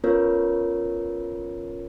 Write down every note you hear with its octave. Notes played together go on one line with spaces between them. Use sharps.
B3 C#4 F4 A#4 B4 C#5